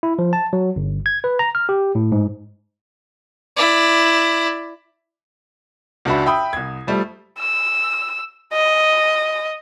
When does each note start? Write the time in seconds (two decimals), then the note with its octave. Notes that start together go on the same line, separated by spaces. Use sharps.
0.03 E4
0.19 F3
0.33 A5
0.53 F#3
0.76 G1
1.06 G#6
1.24 B4
1.39 A#5
1.55 F6
1.69 G4
1.95 A2
2.12 G#2
3.56 E4 D5
6.05 C#2 D4 F#4 E5 B5
6.26 E5 G5 B5 D#6
6.53 C2 G#6
6.87 F3 G3 A3
7.38 E6
8.52 D#5